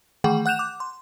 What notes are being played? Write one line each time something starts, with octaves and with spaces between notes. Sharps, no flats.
D#3 E3 A3 G#4 F#5 G5
F#5 F#6 G6 E7 F7
D6
C6